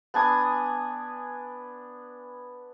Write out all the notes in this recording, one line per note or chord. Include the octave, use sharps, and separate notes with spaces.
B3 D4 G#5 D#6